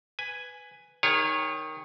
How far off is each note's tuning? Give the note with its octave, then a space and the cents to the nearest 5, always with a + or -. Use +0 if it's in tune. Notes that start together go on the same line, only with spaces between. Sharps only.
B4 +10 G#5 +0
D#3 +0 G#4 -40 C#5 +0